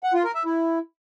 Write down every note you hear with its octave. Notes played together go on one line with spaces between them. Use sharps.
F#5
F4
A#4
E5
E4